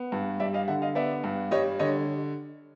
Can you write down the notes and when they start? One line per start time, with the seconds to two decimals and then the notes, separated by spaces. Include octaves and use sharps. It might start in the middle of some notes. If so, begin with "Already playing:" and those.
Already playing: B3
0.12 G2
0.40 G3 D5 E5
0.54 D#5 F5
0.68 D3 E5 F#5
0.82 D#5 F5
0.95 B3 D5 E5
1.24 G2
1.51 G3 C#5 D#5
1.79 D3 C#5 D#5